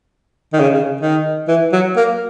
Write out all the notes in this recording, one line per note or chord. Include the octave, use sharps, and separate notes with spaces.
D#3
C#3
C#3
D#3
E3
F#3
A#3